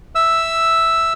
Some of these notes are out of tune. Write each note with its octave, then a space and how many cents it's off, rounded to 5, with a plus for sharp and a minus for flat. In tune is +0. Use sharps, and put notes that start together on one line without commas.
E5 +0 E6 +0